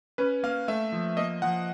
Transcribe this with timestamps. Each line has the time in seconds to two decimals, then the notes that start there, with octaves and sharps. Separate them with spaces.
0.18 C#4 B4
0.43 A#3 F5
0.68 A3 E5
0.92 F3
1.17 A#3 D#5
1.42 F3 F#5